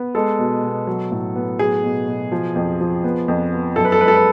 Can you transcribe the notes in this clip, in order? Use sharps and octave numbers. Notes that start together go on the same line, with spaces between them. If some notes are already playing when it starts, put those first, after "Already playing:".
Already playing: B3
G#3 A4
B2
B2
F#3
A2
B3
F#3 G#4
B2
B2
F3
F2
F3
B3
F2
B3
F#2 A4
B4
A4
G#3 B4
A4
B4